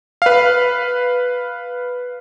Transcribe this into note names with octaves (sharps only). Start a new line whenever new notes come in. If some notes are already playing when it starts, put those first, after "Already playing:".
B4 F5